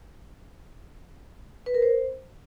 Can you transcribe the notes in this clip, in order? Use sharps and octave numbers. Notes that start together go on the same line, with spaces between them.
B4
A#4
C5